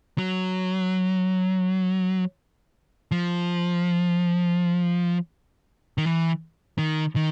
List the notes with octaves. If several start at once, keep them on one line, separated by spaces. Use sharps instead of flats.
F#3
F3
D#3
E3
D#3
D#3